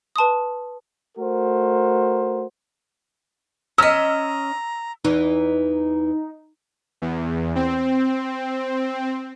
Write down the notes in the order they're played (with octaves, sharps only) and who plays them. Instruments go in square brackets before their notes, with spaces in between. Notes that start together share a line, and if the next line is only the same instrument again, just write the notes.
[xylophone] B4 A5 C6 D#6
[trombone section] A3 F#4 A#4 C5
[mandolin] C#4 D#5 [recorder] A#5 [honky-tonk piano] E6 B6
[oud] E2 E3 [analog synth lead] D#4
[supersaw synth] E2
C4